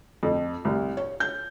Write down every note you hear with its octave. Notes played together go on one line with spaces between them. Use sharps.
F2
C2
C#5
G6